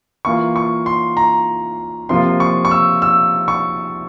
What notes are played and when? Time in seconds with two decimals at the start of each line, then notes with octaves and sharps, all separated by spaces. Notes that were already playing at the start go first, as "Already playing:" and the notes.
0.25 E3 A#3 F4 C#6
0.56 C#6
0.86 C6
1.17 A#5
2.09 C3 F3 A#3 F4 C6
2.40 C#6
2.65 C#6
2.71 E6
3.02 E6
3.48 C#6